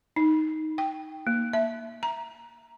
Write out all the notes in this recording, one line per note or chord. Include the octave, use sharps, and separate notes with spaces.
D#4
G5
A#3
E5
A#5